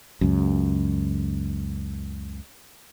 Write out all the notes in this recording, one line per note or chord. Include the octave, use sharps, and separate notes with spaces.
C#2 F#2